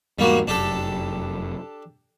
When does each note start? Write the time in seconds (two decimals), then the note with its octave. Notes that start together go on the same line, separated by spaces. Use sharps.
0.19 E2 G#2 G3 A#3 F#4
0.47 F1 F#2 D4 G4 A4